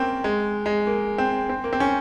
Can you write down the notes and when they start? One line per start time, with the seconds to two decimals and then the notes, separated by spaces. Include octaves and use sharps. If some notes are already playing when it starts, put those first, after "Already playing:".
Already playing: A#3 C4 C#4
0.24 G#3
0.66 G#3
0.87 A#3
1.18 C4
1.50 C4
1.64 A#3
1.73 C4
1.80 C#4